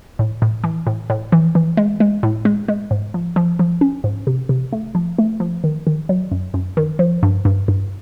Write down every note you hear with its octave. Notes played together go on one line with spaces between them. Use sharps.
A2
A2
E3
A2
A2
E3
E3
G#3
G#3
A2
G#3
G#3
G#2
F3
F3
F3
C#4
G#2
C3
C3
A3
F3
A3
F3
D#3
D#3
F#3
F#2
F#2
D#3
F3
G2
G2
G2